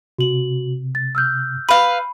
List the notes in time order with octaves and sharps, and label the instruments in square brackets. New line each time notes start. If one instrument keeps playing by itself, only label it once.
[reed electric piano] C3 [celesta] F#4 F#7
[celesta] A6
E6 F6 G6
[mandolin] B4 F5 [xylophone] B5